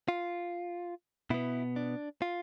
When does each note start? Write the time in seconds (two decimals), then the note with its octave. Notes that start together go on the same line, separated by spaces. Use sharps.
0.08 F4
1.30 B2 B3 E4
1.76 D4
2.22 F4